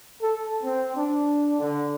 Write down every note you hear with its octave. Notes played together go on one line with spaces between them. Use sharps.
A4
C4
D4
D3